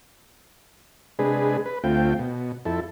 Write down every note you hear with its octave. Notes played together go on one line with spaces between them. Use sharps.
C3 G#3 D4 G#4 B4
B4
D2 A3 C4 F4 G5
B2
F2 E4 A4